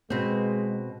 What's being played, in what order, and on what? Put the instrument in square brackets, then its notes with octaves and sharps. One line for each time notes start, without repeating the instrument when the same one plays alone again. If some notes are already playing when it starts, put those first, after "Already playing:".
[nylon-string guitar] B2 C4 [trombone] G#3